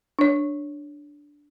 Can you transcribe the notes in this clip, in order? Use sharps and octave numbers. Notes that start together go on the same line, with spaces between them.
D4 C#5